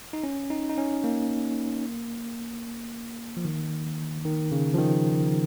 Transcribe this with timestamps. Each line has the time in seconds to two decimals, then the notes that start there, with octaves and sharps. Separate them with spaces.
0.13 D#4
0.24 C#4
0.50 D#4
0.70 D#4
0.77 C#4
1.04 A#3
3.37 F3
3.45 D#3
4.25 D#3
4.52 C#3
4.74 F3
4.79 D#3